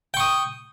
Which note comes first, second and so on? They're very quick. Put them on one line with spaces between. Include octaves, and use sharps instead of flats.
G5 C#6 D#6